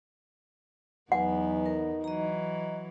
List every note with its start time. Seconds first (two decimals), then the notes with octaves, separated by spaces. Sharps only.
1.12 E2 F#3 B3 D#4 B4 F#5 G#5
1.66 A#4
2.04 E3 F#3 D#5 A#5